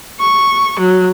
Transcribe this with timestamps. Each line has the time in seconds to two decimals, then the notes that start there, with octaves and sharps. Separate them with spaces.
0.19 C#6
0.78 F#3